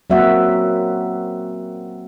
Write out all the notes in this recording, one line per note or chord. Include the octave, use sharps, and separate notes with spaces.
F#3 A#3 C4 F#4 E5 F#5